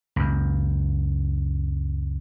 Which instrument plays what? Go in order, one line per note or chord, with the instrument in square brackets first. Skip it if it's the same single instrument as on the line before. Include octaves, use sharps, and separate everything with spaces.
[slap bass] C#2 F#2